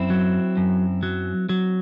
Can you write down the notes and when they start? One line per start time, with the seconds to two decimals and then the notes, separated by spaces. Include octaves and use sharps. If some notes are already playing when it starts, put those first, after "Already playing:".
Already playing: F#2 C4 E4
0.10 F#3
0.57 F#2
1.03 F#3
1.49 F#3